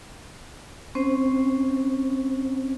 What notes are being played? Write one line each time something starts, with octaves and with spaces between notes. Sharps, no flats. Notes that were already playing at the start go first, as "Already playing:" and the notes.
C4 C#4 C5